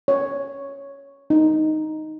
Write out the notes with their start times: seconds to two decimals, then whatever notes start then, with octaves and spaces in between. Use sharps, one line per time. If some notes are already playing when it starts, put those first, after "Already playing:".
0.08 C#5
1.30 D#4